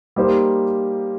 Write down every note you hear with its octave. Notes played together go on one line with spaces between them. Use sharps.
G3 A#3 D#4 G4 C5